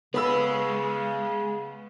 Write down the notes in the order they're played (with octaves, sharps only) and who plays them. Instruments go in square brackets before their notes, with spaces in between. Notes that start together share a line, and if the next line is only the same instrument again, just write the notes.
[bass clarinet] C#3 [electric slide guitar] G#3 [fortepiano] B3 B5 E6